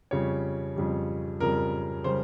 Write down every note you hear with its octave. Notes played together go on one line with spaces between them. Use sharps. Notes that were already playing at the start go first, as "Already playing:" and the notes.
F2 C#3 G3 C#5
F2 C#3 G3
F2 C#3 G3 A#4
C#3 G3 C5